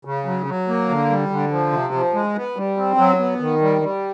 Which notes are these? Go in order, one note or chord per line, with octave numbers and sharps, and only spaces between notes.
C#3
F#3
F#3
A#3
D3
G3
D3
F3
C3
F3
G#3
B3
G3
C4
F#3
B3
D#3
G3
G3